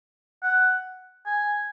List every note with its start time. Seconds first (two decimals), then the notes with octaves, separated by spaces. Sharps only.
0.43 F#5
1.26 G#5